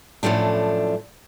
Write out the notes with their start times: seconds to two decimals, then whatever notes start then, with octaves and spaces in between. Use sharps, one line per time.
0.23 F#2 A2 F3 A3 D4